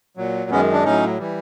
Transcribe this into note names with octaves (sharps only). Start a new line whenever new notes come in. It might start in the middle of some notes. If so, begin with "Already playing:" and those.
A#2 F#3
F#2 D#3 G#3 B3 C#4
D4
A2 F#3 C#4 D#4
E3 G3